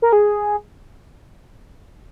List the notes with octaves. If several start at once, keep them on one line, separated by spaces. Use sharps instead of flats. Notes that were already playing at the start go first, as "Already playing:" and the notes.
A#4
G#4